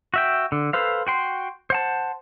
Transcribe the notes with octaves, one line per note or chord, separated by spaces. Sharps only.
F#4 E5 G5
D3
A4 B4 C5 F5
F#4 G5 C6
C5 F#5 A5